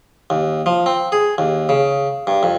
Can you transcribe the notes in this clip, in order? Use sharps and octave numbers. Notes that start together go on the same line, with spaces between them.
D#2
F3
C4
G#4
D#2
C#3
G2
F2